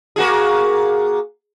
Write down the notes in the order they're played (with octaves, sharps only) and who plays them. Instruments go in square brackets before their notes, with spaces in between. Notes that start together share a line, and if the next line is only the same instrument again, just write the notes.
[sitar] A#3 F#4 G#4